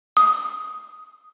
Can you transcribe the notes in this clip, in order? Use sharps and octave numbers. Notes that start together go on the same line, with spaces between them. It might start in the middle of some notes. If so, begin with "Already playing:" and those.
D#6